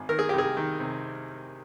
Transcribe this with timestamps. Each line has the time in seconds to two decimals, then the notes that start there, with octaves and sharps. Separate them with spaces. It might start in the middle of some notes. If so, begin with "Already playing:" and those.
Already playing: G#1
0.09 D#3 A#4
0.19 G#4
0.29 C2 G4
0.38 G#4
0.57 D#3
0.80 C3